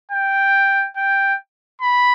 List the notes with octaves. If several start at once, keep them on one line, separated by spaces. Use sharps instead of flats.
G5
G5
B5